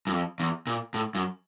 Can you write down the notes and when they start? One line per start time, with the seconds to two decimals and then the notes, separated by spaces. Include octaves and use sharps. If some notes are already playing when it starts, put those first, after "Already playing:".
0.07 F#2
0.12 F2
0.40 E2
0.67 A#2
0.94 A2
1.15 F#2